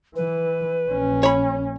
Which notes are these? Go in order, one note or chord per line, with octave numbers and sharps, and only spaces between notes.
E3 B4
A#1 C#4
C#5 B5